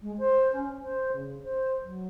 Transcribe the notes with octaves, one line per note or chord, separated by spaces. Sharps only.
G#3
C5
C#4
C5
C#3
C5
F#3